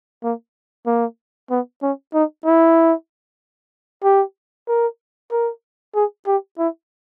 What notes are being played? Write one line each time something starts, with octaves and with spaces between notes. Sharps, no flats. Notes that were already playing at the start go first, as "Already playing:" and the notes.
A#3
A#3
B3
C#4
D#4
E4
G4
A#4
A#4
G#4
G4
E4